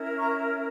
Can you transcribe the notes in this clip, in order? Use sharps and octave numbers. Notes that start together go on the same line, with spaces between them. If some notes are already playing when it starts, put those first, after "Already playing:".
Already playing: C#4 E4 A#4
A#5 C#6